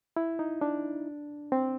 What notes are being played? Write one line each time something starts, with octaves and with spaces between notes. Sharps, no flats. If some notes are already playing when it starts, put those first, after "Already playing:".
E4
D#4
D4
C4